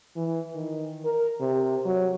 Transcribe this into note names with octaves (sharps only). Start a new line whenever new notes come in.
E3
D#3
A#4
C3
F#3